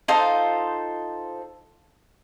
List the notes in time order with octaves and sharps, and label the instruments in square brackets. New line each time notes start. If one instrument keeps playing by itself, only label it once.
[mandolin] D#4 F4 A4 C5